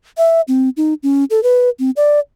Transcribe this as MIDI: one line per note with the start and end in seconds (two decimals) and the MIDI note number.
0.18 0.41 76
0.48 0.70 60
0.77 0.94 63
1.03 1.24 61
1.30 1.43 69
1.43 1.69 71
1.79 1.90 60
1.97 2.19 74